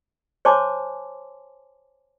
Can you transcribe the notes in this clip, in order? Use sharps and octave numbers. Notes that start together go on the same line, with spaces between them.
C5 C#5 G#5 A5 C6 D6